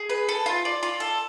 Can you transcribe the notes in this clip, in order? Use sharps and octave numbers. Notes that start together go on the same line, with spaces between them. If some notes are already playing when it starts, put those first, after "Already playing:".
Already playing: G#4
B4
A4
F4
D5
F4
A4